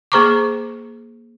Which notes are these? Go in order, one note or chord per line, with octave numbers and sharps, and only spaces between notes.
A#3 G#4 C5 A#5 C#6 D6